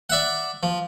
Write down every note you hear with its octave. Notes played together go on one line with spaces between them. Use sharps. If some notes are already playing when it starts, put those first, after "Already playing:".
D5 E5 F#5
F3